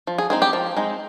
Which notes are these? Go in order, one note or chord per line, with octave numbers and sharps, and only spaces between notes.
F3
G#4
G#3 C4 D#4 G#4
G4
F3
G#3 C4 D#4